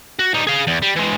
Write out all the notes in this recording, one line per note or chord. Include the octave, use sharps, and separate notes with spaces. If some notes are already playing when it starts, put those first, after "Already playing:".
F#4
G3 D#4
G#4 F5
E2
G3
E3 G#3